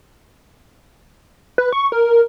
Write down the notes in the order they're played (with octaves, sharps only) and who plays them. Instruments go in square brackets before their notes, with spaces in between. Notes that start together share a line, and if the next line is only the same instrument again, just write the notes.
[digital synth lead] B4
C#6
A#4